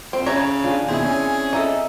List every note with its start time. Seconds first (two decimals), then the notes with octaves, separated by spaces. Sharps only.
0.13 F2 C4
0.26 C#3 C#5 E5 A#5
0.64 D4 F4 G#4
0.88 D#2 B2 D#3 C4 E4 G#4
1.03 C#4 G#5
1.53 D#4 A4 D#5 E5